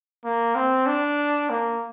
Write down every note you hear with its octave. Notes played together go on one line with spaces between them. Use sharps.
A#3
C4
D4
A#3